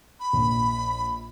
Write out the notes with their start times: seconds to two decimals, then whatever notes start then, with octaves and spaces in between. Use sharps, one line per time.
0.20 B5
0.33 A#1